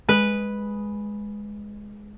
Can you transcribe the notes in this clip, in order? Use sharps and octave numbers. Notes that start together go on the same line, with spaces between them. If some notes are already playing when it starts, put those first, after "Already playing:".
G#3 B4